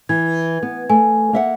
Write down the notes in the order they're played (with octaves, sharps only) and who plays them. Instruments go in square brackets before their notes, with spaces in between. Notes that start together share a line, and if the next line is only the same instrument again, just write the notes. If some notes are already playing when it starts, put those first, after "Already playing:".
[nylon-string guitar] E3 [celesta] G#6
[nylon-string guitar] B3
[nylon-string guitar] A3 [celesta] G#5
[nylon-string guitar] A#3 E5 F#5